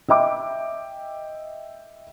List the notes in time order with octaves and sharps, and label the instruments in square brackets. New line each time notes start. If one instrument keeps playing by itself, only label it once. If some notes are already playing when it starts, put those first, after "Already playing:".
[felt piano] D#5 E5 G5 D6